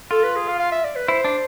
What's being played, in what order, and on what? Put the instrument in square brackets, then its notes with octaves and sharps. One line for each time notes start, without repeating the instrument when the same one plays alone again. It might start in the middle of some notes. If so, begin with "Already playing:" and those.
[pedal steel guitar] F4 [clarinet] A4
[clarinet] B4
G#4
F5
F5
E5
D5
B4
[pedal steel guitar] E4 [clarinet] C5
[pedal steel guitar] D4